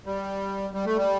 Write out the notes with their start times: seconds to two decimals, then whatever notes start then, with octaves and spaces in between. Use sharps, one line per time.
0.06 G3
0.74 G3
0.86 A3
0.96 G3